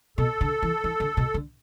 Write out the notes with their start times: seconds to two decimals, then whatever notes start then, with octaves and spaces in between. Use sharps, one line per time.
0.18 B2 A4
0.41 D3
0.63 E3
0.84 E3
1.00 D3
1.17 B2
1.34 D3